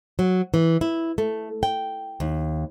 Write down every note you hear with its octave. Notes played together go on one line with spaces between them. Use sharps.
F#3
E3
E4
A3
G5
D#2